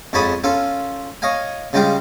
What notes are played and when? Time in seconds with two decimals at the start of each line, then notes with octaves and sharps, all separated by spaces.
0.13 F2 G#2 C#5 A5 B5 D#6
0.44 C#4 F4 A4
1.22 C#5 D#5 F5 G#5
1.73 C#3 G3 G#3 F4 G4